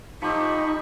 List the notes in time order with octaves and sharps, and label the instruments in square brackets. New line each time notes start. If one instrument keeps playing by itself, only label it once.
[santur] F3 G4 E6 [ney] D#4 [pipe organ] B5 C#6